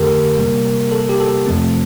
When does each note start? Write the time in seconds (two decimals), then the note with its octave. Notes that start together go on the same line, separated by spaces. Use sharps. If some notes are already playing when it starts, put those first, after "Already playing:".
Already playing: F2 D3 A3 G4 A4 A#4
0.37 C3 G3 A#3
0.92 A4
1.09 G4
1.20 A4
1.47 F2 C3 F3 A3 C4